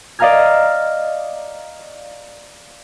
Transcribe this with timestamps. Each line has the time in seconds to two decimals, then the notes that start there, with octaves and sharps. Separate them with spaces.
0.19 D5 D#5 F5 A#5 F6 G#6